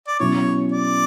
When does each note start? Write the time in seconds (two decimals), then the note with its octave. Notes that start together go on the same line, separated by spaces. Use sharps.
0.08 D5
0.20 B2 F#3 C#4 E4 C#5
0.72 D5